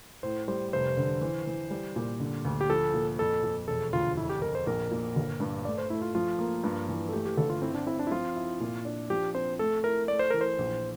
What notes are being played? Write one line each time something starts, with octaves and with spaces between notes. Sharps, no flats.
A2 C5
G3 C5
F1 C5
D3
E3
E3
G3
A#2
D3
D2
G4
F3 A4
A#2
F2 A4
F2
E1 A4
D2 F4
F2 E4
G4
F2 A#4
C5
A#1 A#4
A#2
G1
G2
A3 D5
C5
A3 E4
F4
F3 F4
A#3
G2
E3
A4
A3 G4
G4
G1 A4
F4
C4 E4
D4
C4 E4
D4
E4
F3 F4
E4
A#2
D4
F3 G4
C4 C5
A3 A4
E4 A#4
A3 D5
C5
E3 A#4
C5
A#1